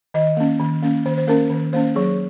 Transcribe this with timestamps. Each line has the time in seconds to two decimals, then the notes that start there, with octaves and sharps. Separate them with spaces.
0.14 D#3 D#5
0.37 A#3 C#4
0.60 D#3
0.82 A#3 C#4
1.06 D#3 C5
1.18 C5
1.27 A#3 C#4 A#4
1.50 D#3
1.73 A#3 C#4 C5
1.95 F#3 G#4